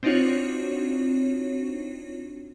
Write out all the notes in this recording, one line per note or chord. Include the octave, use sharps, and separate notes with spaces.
C4 D4 D#4 F4 F#4 C#5